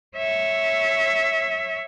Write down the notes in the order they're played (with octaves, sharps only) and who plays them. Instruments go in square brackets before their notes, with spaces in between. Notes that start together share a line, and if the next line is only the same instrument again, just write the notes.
[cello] C#5 E5